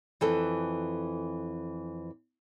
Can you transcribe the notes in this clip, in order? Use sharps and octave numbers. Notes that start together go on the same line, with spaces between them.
F2 E3 A4